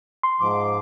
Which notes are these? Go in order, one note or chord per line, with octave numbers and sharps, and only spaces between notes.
C6
G#2 F3 D6